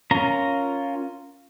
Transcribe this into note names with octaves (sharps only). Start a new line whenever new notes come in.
C#4 F4 A#4 A#5